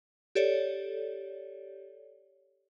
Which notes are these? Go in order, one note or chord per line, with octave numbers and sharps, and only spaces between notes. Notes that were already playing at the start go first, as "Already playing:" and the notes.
G4 A4 C#5 D5